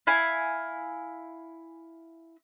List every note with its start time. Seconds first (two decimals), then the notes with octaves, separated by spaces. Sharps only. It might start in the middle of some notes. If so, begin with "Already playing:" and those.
0.07 E4 F5 G#5